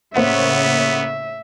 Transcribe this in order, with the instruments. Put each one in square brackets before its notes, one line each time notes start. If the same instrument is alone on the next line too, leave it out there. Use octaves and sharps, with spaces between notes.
[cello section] A2 C#3 C#5 [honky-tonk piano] A#3 C5 F#5 [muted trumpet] B3 [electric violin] E5